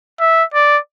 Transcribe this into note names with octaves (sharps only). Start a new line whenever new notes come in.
E5
D5